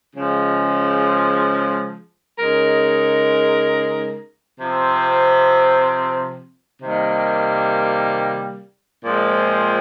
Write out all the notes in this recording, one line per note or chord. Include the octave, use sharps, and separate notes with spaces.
C#3 F3 G#3
C#3 G#3 D#4 A#4
C3 F3 C4
C3 D#3 G3 A#3
A#2 F3 G#3 C4